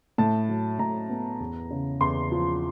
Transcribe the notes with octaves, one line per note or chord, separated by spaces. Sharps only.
A2 A5
F#3
A2 A#5
B3
E2
C#3
E2 C6
F3